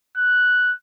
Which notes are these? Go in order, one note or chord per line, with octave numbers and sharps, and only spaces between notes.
F#6